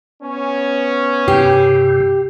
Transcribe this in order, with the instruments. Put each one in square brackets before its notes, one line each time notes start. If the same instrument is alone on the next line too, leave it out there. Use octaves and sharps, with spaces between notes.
[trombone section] B3 C#4
[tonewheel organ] G2 C3 [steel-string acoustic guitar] G4